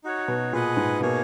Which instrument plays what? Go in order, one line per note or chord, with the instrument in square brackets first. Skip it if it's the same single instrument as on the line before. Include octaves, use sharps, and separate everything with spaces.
[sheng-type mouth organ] D#4 F#4 C#5
[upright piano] B2
[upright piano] A#2 [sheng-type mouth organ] G#4 B4 D#5 F#5
[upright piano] G#2
[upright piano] B2 [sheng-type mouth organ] A#3 D#4 G#4 C#5